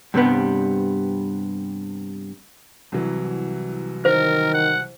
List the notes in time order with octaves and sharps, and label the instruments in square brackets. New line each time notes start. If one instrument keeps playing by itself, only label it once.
[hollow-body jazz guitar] G2 C3 G3 B3
[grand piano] C2 E3 F#3
[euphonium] D#3 [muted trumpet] A#4 [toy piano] C5
[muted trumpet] F#5